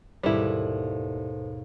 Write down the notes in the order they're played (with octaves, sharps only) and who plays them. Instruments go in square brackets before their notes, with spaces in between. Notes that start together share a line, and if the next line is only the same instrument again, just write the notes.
[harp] D#2 G#2 B2 [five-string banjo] G3 E4 [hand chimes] A4 C5